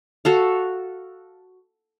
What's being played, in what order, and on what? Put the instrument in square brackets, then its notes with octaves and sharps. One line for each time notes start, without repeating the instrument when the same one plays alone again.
[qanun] F#4 A4 F5